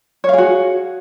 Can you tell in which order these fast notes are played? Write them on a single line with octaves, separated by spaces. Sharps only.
C#5 F5 G#4 F#4